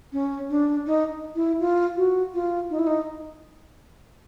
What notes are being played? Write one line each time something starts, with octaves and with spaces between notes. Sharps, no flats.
C#4
D4
D#4
E4
F4
F#4
F4
D#4
E4
D#4